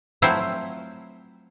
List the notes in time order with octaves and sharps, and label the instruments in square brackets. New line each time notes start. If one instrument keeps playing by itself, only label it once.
[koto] F3 F#3 A3 C4 E4 C5